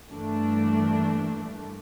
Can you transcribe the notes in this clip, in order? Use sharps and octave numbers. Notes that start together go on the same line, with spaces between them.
G2 E3 A3 A#3 D4